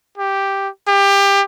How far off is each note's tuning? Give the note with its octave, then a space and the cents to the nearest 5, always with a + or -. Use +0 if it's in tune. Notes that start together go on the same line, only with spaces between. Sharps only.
G4 +0
G4 +20